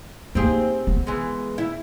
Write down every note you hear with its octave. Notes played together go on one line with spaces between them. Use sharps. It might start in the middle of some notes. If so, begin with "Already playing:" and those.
A#3 C4 D#4 G4 G#4
B3
E3 G#3
E4